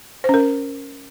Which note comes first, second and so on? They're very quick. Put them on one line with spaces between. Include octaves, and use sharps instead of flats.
C5 C#4 A#4